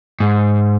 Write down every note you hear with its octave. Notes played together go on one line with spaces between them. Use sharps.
G#2